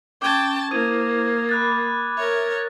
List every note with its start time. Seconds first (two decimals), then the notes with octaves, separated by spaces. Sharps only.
0.22 C#4 G5 A5 C#6 D6 G#6
0.71 A#3 E4 C5 D#6 G#6 D#7
1.49 B5 D6 F#6 A6
2.17 A#4 C#5 E5